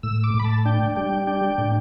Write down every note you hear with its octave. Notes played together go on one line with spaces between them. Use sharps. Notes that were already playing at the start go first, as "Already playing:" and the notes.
A2 E6
D6
A2
B5
A5
D4 G5
G3 G5
D4 G5
A2